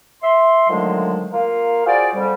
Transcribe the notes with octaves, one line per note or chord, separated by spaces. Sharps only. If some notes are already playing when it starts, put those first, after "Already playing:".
E5 C6
D3 D#3 F3 F#3 G#3 A3
A#3 F4 A#4 F5
F4 F#4 G#4 C5 D5
F2 G3